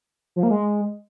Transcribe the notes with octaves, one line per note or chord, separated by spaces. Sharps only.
F3
A#3
G#3